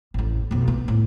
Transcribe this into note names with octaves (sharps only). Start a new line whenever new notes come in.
A1 F2
B1 F2
B3
A2